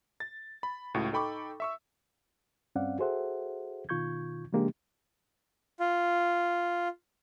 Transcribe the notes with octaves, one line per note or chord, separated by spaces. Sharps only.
A6
B5
C#2 A2 F#4
D#4 A4 G5 B5 C#6 D6
E5 C#6 E6
G2 C4 C#4 D5 F5 F#5
F#4 G#4 A4 C5 E5 F#5
B2 D#3 F4 C#6 G6 G#6
C#3 F3 G#3 A#3 D4 G4
F4